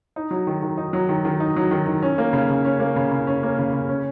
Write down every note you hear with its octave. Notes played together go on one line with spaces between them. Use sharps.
D#4
F#3
D#3
D#3
D#4
F#3
D#3
D#3
D#4
F#3
D#3
D#3
C#4
A#3
C#3
C#3
C#4
A#3
C#3
C#3
C#4
A#3
C#3
C#3
C#4